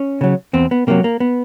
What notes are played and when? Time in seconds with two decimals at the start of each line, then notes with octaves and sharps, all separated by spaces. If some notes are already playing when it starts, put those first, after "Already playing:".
Already playing: C#4
0.21 C#3 F#3
0.53 E2 C4
0.71 B3
0.87 C3 D#3 F#3 A#3
1.04 A#3
1.20 B3